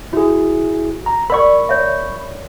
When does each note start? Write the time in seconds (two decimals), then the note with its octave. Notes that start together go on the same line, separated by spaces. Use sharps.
0.13 E4 F#4 G#4
1.06 A#5
1.30 A#4 D5 B5 C#6
1.69 C#5 E5